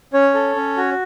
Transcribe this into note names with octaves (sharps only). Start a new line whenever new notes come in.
C#4 C#5
A4
C#4
F#4